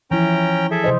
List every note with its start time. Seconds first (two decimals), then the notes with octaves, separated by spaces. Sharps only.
0.11 E3 F3 C#4 E4 G5 A#5
0.71 G#4 A4 E5
0.84 C3 C5 D#5